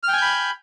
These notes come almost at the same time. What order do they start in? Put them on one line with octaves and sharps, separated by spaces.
F6 G5 G#5 G6 B5